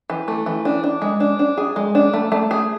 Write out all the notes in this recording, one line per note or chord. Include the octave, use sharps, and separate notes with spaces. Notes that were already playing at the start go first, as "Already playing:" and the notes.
E3
A3
E3
D4
D4
G#3
D4
D4
G#4
G#3
D4
A3
A3
G#4